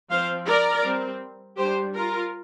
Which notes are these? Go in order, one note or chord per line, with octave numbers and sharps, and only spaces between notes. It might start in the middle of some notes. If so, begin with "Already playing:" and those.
F3 C4 C5 F5
A#4 D5
G3 C4
G3 D4 G4 C5
F4 A#4